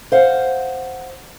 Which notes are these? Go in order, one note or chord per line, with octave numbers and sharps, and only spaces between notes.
C5 F5 F#5